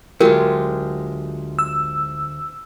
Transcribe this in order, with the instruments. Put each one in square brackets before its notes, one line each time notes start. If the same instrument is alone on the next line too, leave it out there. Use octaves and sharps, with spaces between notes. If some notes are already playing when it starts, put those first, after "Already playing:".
[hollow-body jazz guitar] D2 F#3 [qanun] G#3 F4 G4 [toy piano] A#4
[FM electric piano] E6